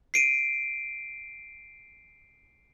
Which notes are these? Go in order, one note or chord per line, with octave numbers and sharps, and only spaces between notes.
C7 D7 D#7